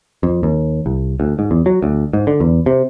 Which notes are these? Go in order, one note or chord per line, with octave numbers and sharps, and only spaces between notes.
F2
D#2
C2
D2
G#2
E2
F#3
D2
G#2
D3
E2
C3